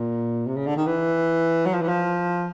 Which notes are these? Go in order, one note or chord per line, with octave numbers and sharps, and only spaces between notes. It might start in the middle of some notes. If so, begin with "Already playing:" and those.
Already playing: A#2
C3
C#3
D3
D#3
E3
F#3
F3
E3
F3